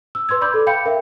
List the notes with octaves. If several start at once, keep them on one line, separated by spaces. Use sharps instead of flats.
E6
B4 C6 E6 G#6
D5 B5 D6 G6
A4
F5 G5 B5 G6 C#7
A#4 E5